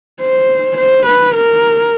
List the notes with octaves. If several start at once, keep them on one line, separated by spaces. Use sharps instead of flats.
C5
C5
B4
A#4